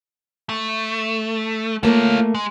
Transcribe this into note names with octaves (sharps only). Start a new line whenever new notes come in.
A3
A3 A#3 F4 C#5
G#3